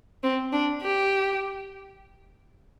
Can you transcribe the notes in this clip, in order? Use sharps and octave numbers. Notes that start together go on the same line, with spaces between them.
C4
D4
G4